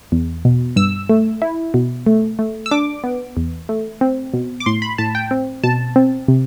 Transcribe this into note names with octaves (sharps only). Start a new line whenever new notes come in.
E2
B2
G2 E6
A3
E4
B2
A3
A3
E6
D4 D6
B3
E2
A3
C4
B2
D6
A2 C6
B5
A2 A5
G5
C4
B2 A5
C4
C3